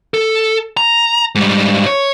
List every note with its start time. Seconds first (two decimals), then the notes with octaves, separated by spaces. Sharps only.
0.14 A4
0.77 A#5
1.35 G#2 G3
1.87 C#5